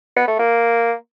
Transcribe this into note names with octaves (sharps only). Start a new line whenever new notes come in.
B3
A3
A#3